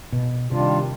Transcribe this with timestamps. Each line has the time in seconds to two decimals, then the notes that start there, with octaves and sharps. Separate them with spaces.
0.13 B2
0.51 C3 D#3 G3 D4 F4